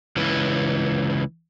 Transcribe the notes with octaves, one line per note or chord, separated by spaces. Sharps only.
C#2 E3